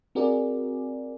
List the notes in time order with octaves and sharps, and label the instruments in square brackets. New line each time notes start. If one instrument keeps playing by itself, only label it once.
[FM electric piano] C4 F#4 G#4 A#4 D5